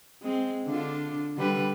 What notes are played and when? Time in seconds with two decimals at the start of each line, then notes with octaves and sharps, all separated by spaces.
0.22 G#3 C4
0.66 D3 D4 F4
1.37 D3 G3 B4